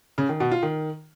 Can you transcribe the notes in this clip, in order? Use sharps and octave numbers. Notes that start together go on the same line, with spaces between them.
C#3
D#3
B2
F4
D#3